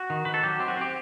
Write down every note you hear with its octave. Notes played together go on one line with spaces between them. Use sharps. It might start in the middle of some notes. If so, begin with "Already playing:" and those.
Already playing: F#4
D#3
D#3 B4
A4
F#3 G4
C4
F#4
C4 G4